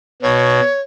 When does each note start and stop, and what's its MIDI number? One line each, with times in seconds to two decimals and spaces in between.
0.22 0.60 47
0.22 0.80 73